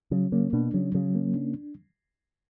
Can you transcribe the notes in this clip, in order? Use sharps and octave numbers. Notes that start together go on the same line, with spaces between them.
C#3 F#3
C#3 A#3
B2 D4
C#3 F#3
C#3 F#3
A#3
D4